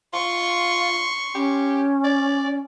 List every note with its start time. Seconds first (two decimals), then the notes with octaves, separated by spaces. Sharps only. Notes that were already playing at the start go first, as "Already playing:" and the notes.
0.13 F4 C6 C#6
1.35 C#4 G4
2.04 D5